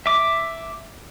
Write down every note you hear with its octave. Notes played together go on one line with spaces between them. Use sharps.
E5 D6